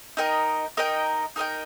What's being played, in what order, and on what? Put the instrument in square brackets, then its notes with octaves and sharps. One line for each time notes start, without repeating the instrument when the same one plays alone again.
[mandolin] D#4 A#4 D#5 G5
D#4 A#4 D#5 G5
D#4 A#4 D#5 G5